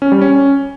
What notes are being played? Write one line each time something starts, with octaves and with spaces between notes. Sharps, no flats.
C#4
G3
C#4